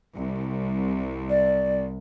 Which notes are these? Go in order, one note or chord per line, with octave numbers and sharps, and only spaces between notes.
C2
D5